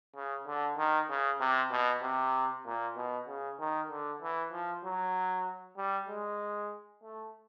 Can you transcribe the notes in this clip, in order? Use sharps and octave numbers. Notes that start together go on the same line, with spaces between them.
C#3
D3
D#3
C#3
C3
B2
C3
A#2
B2
C#3
D#3
D3
E3
F3
F#3
G3
G#3
A3